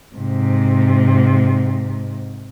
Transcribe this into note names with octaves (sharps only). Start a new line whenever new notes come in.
G#2 C3